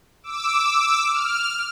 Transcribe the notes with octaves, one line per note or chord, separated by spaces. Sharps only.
D6 E6
F6